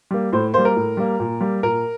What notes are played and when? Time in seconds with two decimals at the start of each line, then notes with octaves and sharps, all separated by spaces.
0.11 G3 A#3
0.33 A2 C5
0.54 G3 A#3 C5
0.65 A#4
0.76 A2
0.97 G3 A#3
1.20 A#2
1.41 G3 A#3
1.63 A#2 A#4